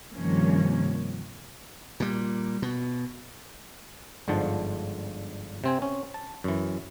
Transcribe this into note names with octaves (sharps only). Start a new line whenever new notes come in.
G2 C3 D#3 F3 A#3 C#4
A#2 G3
B2
G1 G#2 D3 F3 A5
C3 C4 G#5
C#4
A5
F#2 E3